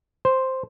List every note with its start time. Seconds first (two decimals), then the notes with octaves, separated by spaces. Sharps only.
0.25 C5